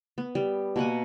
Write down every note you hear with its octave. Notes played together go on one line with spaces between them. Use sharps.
B3
G3
B2 A#3 F#5 G#5